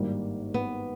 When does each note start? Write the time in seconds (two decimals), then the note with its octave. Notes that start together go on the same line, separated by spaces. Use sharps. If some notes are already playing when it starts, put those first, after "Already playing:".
Already playing: G#1 G2 D#3 G3 A#3
0.54 B3